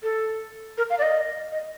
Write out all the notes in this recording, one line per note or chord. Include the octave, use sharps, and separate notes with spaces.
A4
A#4
F5
D5
D#5
D#5